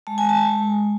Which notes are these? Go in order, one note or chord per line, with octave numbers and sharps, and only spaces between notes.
G#3 A5
G#5
A5
G#3